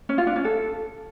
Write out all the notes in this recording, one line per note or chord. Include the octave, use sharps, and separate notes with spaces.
C#4
F4
D4
C#4
A4